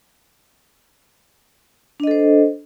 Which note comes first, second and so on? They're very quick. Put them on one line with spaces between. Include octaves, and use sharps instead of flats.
D4 D#5 A4 C5